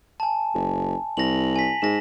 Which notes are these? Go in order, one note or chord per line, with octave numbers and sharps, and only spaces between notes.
G#5 A5
F#1
C2 A#6 F7 F#7
G#5 B6
G#2 A#6 E7